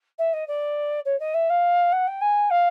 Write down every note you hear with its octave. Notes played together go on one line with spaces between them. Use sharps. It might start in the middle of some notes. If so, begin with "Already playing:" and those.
E5
D#5
D5
C#5
D#5
E5
F5
F#5
G5
G#5
F5